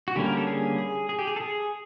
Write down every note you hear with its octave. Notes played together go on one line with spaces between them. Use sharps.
F#4
D3 G3 A#3 C#4 G4
A#4
A4
G#4
G#4
G#4
G4
G#4
A4
G#4